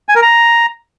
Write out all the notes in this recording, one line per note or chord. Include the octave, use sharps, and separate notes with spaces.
G#5
A#4
A#5